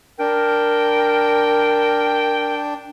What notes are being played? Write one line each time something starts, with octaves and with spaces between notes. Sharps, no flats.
D4 A#4 G5